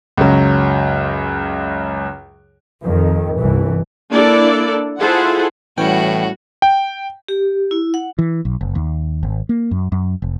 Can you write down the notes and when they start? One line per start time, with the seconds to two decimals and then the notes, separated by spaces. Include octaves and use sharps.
0.17 C#2 F#2 F#3
2.82 F2 D#3
3.37 G1 C2 E3
4.10 A#3 D4 E4 A4 D5
4.98 E4 F4 G#4 A4 C5 F#5
5.78 A2 E3 G3 C#4 F#4 F#5 G5
6.62 G5
7.28 G4
7.71 E4
7.94 F#5
8.19 E3
8.45 B1
8.61 F#1
8.75 D#2
9.23 G#1
9.49 A#3
9.71 F#2
9.92 F#2
10.22 F1